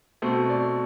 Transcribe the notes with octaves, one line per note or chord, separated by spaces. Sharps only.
B2 A3 C4 C5
D5